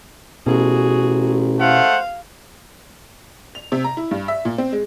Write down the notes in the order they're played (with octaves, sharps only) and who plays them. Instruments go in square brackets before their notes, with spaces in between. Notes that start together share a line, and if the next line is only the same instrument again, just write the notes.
[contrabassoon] A1 [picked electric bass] B2 [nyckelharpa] F#4 G#4
[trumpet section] A3 C5 F#5 [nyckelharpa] F5
[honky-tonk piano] F7
C3
A#5
E4
G2
E5
A#2
C4
G#3